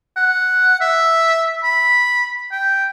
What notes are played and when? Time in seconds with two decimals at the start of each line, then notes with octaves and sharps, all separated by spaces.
0.16 F#5
0.81 E5
1.63 B5
2.52 G5